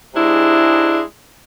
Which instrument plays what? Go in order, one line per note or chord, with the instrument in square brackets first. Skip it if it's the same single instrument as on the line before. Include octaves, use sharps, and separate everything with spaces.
[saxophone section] G#2 C3 G#3 D4 E4